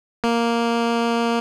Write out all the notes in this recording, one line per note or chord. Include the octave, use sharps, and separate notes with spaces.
A#3